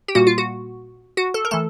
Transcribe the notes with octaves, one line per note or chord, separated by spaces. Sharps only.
G4
A#2 G3 A#3 F#4
F4
F#4
F#4
A4
A#4
E3 A3 A4